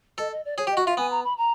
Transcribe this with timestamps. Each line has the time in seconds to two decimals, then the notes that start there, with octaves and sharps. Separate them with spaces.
0.18 A4 D#5
0.32 D#5
0.45 D5
0.57 G#4 C#5
0.67 G4
0.71 D#5
0.77 F#4
0.85 F4 E5
0.97 B3 G#5
1.11 A#5
1.24 B5
1.37 A#5